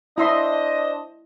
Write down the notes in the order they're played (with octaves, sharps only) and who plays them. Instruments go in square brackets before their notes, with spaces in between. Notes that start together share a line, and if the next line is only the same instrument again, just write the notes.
[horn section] D4 C5 D#5 [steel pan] E4 E5 C6